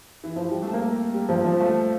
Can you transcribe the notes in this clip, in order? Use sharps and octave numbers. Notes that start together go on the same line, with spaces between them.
E3
F3
G3
A3
A#3
G3
F3
F3
A3